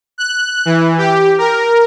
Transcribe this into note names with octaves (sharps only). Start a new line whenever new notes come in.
F#6
E3
G4
A#4